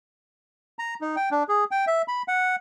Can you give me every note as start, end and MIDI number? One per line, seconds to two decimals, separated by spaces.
0.79 0.94 82
1.01 1.16 63
1.16 1.29 79
1.31 1.43 62
1.49 1.64 68
1.71 1.85 79
1.87 2.02 76
2.08 2.22 83
2.28 2.56 78